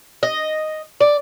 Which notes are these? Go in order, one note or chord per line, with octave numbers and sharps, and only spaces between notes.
D#5
D5